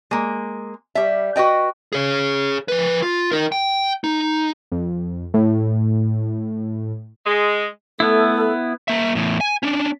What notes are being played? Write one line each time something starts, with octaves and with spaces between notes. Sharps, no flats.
G#3 A#3
G3 E5
F#4 B4 D#5 G5
G#4 C#5
F3 B4
F4
D#4 A#4
G5
D#4
F2
A2
G#3
A3 B3 E4 A4
A#3 E5
E2 A2
G#5
C#4 D4